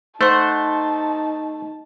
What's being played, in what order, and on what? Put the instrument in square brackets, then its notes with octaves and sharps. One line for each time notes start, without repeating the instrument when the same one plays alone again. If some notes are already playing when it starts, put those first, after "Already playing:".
[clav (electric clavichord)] A3 [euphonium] D#4 [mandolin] C5 F#5 [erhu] A5